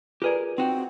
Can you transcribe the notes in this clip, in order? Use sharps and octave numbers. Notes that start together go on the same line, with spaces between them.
F4 G4 G#4 A#4 B4 D5
C4 D#4 F#4 G5